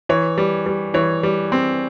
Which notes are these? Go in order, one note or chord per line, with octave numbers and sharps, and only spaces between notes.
E3 C#5
G3
G3
E3 C#5
G3
C4